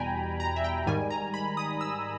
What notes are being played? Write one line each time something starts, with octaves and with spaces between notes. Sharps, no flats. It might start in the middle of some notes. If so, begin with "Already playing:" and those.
Already playing: E2 B2 G3 G5 G#5 A#5 B5
A#5
E5
G5
G#2 D#3 G3 G#5
A#5
B5
D#6
E6